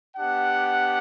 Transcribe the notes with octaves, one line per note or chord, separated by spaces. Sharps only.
B3 D4 G4 F#5